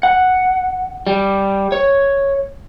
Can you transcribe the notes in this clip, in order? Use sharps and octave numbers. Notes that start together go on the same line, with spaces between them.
F#5
G3
C#5